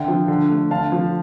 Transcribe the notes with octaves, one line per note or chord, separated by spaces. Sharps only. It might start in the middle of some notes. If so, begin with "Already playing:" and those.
Already playing: D3 E5 G5
F3
D3
A3
D3 F5 A5
F3